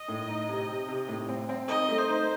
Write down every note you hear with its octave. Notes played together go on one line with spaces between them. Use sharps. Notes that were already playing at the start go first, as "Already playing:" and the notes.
Already playing: D#5
A2
D#4
C3
C3
C3
A2
C4
C4
D#4 D#5
A3
C5
D#4